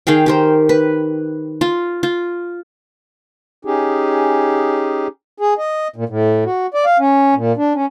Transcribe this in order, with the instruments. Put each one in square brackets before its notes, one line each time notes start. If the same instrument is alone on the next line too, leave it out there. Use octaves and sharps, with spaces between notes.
[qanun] D#3 G#4 F5 G5
G4 A#4 C5
B4
F4
F4
[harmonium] C#4 D#4 G4 G#4
G#4
D#5
A#2
A2
F#4
D5
F5
C#4
A#2
D4
C#4